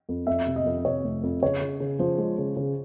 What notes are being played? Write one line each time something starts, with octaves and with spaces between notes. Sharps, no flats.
F2
F2 E5
C3
D#5
F2
C3 C#5
F1
F2
C#3 C#5
C#3
C#3
F3 C5
G#3
C#3
C#3